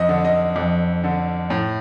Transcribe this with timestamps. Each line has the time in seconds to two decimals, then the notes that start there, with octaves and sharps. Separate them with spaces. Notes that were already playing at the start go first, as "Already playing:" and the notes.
Already playing: F2 D#5
0.09 D3
0.25 D#5
0.56 F2
1.04 D3
1.50 A2